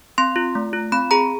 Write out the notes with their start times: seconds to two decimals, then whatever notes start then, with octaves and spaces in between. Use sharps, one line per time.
0.18 C4 C6
0.36 F4
0.55 A3
0.73 F4
0.92 C4 B5
1.11 G#4 A#5